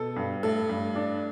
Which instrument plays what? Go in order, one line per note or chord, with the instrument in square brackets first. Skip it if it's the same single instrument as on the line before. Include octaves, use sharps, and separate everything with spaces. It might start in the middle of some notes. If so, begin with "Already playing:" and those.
Already playing: [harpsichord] B2 [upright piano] A4
[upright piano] G2
[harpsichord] A2 [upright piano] A4
[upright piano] G2
D4